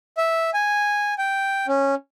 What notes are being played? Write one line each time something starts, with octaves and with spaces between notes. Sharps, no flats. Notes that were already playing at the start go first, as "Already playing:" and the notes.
E5
G#5
G5
C#4